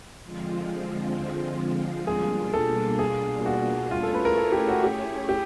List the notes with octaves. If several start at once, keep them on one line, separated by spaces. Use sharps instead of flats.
D3 F3 G#3 C4 F4
B2 G3 A#3 D4 F4 G#4
A4
G#4
F#4
A3 C#4 E4 F4 G#4 C#5
A4
B4
A#4
A4
G4
F#4
G4
G4